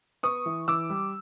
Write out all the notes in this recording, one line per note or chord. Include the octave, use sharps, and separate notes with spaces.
B3 C#6 D#6
E3
E3 D6 E6
G3